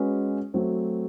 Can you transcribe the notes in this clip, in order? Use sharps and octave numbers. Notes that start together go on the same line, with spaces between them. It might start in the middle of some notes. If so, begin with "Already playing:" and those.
Already playing: G#3 C#4 F#4 B4
F#3 A3 C4